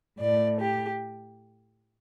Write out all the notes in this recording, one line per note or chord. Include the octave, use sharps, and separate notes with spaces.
A2 A3 D5
G4